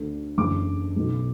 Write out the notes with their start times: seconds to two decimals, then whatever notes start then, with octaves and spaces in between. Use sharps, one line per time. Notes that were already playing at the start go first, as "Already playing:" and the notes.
Already playing: D2 D3
0.38 F#1 E2 D3 D6
0.96 B1 B2